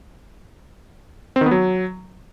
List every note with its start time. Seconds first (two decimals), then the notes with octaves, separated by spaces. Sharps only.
1.36 C4
1.41 D#3
1.46 B3
1.51 F#3